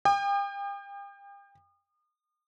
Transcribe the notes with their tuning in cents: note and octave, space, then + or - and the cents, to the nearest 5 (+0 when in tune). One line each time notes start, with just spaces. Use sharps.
G5 +35 D#6 -40